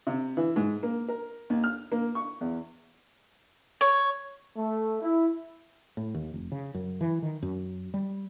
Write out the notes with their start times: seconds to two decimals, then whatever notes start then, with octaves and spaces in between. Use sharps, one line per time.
0.07 C3
0.37 E3
0.56 G#2
0.83 A#3
1.08 A#4
1.50 D#2
1.64 F6
1.92 A#3
2.15 C#6
2.41 E2
3.81 C#5
4.57 A3
5.02 E4
5.97 A2
6.14 D#2
6.34 F1
6.52 C#3
6.74 F#2
7.01 E3
7.22 D#3
7.42 F#2
7.94 G3